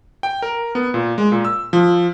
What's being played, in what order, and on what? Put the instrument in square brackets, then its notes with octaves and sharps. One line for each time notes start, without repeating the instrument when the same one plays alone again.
[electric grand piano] G5
A#4
B3
A#2
G#3
A#2
E6
F3